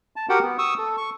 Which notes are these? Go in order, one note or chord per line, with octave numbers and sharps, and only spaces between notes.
A5
F#4 G4 A#4 F#5 G5
B3
C#6 D#6 E6
A4
C#6